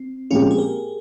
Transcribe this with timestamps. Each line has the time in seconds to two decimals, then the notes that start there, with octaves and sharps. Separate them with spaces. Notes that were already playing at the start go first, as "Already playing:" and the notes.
Already playing: C4
0.31 A#2 F3 G#3 C4 C#4 F4 G4
0.51 G#4
0.58 G4 A#4